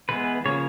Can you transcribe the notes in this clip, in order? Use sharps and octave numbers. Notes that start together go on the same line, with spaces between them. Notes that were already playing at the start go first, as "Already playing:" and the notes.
E3 G#3 B3 B4
C#3 F3 A#3 C#5